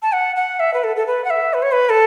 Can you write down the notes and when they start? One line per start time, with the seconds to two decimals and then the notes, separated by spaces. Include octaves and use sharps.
0.02 A5
0.12 F#5
0.36 F#5
0.60 E5
0.74 B4
0.84 A4
0.96 A4
1.07 B4
1.24 F#5
1.30 E5
1.54 B4
1.62 C#5
1.72 B4
1.90 A4